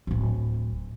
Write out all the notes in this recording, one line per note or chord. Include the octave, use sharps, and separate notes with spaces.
D1 G#1